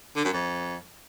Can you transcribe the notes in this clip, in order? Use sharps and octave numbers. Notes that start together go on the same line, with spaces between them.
D3
F#2
F2